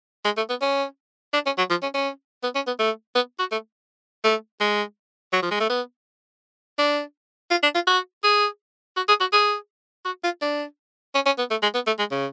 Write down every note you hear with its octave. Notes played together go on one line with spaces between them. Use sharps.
G#3
A3
B3
C#4
D4
C#4
F#3
F3
C#4
C#4
B3
C#4
B3
A3
B3
F#4
A3
A3
G#3
F#3
F3
G#3
A3
B3
D4
F4
D4
F4
F#4
G#4
F#4
G#4
F#4
G#4
F#4
F4
D4
C#4
C#4
B3
A3
G#3
B3
A3
G#3
C#3